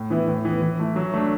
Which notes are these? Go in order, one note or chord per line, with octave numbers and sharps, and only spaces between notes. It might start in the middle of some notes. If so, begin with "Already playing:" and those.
Already playing: A2
E3 B3 E4
A2
E3 B3
E3
A3 E4
F#3
A3 D4